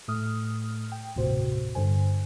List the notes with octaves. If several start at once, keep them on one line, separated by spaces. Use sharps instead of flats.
A2 A3 D#6 F6
G5
G1 D#2 A2 C3 F#4 C5
G2 D3 C5 G#5